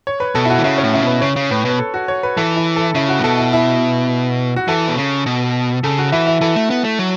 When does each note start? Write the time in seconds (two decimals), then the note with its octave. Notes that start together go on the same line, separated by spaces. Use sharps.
0.07 C#5
0.20 B4
0.35 B2 A4
0.45 E4
0.50 F#4
0.58 E3
0.64 C#3 E4
0.78 C#4
0.83 A2
0.93 C#3 E4
1.02 B2 B4
1.21 C#3 C#5
1.36 C#3
1.51 A2 B4
1.65 B2 B4
1.79 A4
1.94 F#4
2.08 C#5
2.23 B4
2.37 E3 A4
2.56 E4
2.76 A4
2.95 C#3 E4
3.09 F#4
3.19 A2
3.24 B2 A4
3.38 E4
3.53 E4
4.56 F#4
4.68 E3 A4
4.88 B2
4.97 C#3
5.26 B2
5.83 C#3 A4
5.98 F#4
6.12 E3 E4
6.27 E4
6.41 E3 A4
6.56 A3
6.70 B3
6.84 A3
6.99 F#3